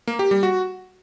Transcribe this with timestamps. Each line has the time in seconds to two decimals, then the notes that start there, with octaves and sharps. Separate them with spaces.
0.07 A#3
0.19 G4
0.31 G3
0.43 F#4